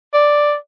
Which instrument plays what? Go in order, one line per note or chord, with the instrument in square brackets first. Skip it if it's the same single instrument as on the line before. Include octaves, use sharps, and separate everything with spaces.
[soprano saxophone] D5